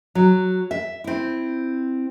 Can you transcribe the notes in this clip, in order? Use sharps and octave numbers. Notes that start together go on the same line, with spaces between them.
F#3
E5
C4 E4